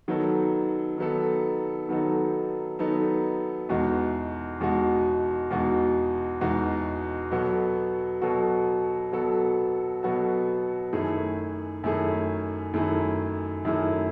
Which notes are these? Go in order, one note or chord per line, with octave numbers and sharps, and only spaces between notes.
D#3 F#3 B3 D#4 A4
D#3 F#3 B3 D#4 A4
D#3 F#3 B3 D#4 A4
D#3 F#3 B3 D#4 A4
E2 B2 G#3 D#4 F#4
E2 B2 G#3 D#4 F#4
E2 B2 G#3 D#4 F#4
E2 B2 G#3 D#4 F#4
B2 F#3 B3 F#4 A4
B2 F#3 B3 F#4 A4
B2 F#3 B3 F#4 A4
B2 F#3 B3 F#4 A4
F#2 D#3 A3 E4 G#4
F#2 D#3 A3 E4 G#4
F#2 D#3 A3 E4 G#4
F#2 D#3 A3 E4 G#4